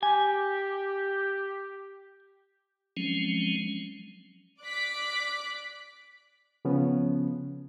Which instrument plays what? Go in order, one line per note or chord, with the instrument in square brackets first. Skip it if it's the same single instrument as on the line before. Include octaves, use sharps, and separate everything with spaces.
[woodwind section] G4 [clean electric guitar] G#5
[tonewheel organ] F3 F#3 G#3 C4 C#4
[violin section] D5 D6 F#6 B6
[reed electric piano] C#3 F3 B3 C#4